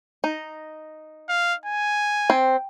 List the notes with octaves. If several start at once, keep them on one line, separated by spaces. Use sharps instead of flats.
D#4
F5
G#5
C4